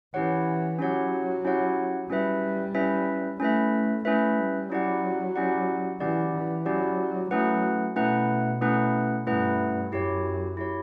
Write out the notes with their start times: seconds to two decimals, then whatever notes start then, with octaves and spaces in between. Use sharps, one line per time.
0.14 E3 C#4 E4 G4 C#5 F#5
0.79 F#3 C#4 E4 G4 C#5 F#5
1.44 C#4 E4 G4 C#5 F#5
2.10 G3 C#4 E4 B4 E5
2.74 C#4 E4 B4 E5
3.39 A3 C#4 E4 B4 E5
4.05 A3 C#4 E4 B4 E5
4.38 G3
4.70 F#3 C#4 E4 G4 D5 F#5
5.36 C#4 E4 G4 D5 F#5
6.00 E3 C#4 E4 G4 D5 F#5
6.33 E3
6.65 F#3 C#4 E4 G4 D5 F#5
7.30 F#3 A3 C#4 E4 B4 F#5
7.96 B2 A3 C#4 E4 B4 F#5
8.61 A3 C#4 E4 B4 F#5
9.27 G2 A3 C#4 E4 B4 F#5
9.92 F#2 E4 G4 C#5
10.57 E4 G4 C#5